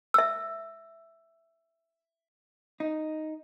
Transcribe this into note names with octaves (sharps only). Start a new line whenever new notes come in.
E5 E6
D#4